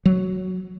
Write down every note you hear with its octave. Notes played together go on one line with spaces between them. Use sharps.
F#3